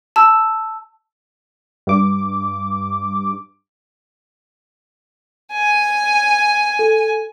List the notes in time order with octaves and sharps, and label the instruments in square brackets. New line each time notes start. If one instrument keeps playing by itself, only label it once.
[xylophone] A5 E6
[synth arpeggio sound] G2 D6
[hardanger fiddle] G#5
[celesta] A4